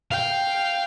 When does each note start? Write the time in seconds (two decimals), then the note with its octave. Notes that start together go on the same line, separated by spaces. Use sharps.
0.11 F5 G5